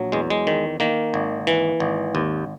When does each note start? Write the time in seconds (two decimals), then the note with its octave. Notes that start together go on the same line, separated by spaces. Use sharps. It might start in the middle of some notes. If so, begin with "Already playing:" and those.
Already playing: A#1 F#3
0.12 E2 G#3
0.30 G#3
0.47 D#3
0.80 D#3 A#3
1.14 G#1
1.47 E3
1.80 G#1
2.15 D#2